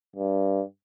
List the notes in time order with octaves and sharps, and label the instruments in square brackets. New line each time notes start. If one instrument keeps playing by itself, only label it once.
[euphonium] G2